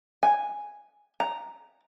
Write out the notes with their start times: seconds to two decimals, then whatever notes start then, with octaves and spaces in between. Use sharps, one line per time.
0.23 G#5
1.20 A#5